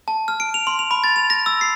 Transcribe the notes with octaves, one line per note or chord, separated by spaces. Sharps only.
A5
F6
D7
F7
C6
F7
B5
A6
F7
A#6
E6
C7